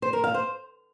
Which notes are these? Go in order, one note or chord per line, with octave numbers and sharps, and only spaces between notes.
C5
A#4
F5
C5